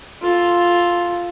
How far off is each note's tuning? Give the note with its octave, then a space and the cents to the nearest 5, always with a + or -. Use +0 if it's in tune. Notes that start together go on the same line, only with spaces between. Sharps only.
F4 +0 A4 +0